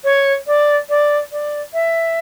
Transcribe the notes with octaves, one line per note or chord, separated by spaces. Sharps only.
C#5
D5
D5
D5
E5